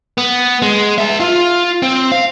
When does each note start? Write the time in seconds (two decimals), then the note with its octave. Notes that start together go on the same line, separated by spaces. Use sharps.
0.18 B3
0.62 G#3
0.98 G#4 E5
1.20 F4
1.83 C4
2.12 F5